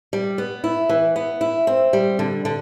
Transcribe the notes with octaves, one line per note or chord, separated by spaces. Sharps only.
G3
B3
E4
E3
B3
E4
C4
G3
D3
D3